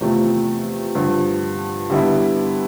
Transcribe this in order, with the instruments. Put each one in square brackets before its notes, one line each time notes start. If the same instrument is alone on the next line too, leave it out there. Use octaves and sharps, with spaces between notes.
[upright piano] E2 C3 F3 A3
G2 D3 F3
D3 G3 B3 E4